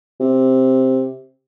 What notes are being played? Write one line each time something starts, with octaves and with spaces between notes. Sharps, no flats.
C3